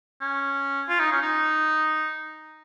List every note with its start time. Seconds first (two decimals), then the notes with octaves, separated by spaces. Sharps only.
0.21 C#4
0.89 F4
1.00 D#4
1.11 C#4
1.22 D#4